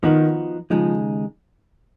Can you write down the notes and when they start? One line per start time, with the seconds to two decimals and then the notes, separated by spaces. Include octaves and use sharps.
0.03 D#3 F3 B3 D#4 F#4
0.70 D#2 C#3 F3 G#3 D#4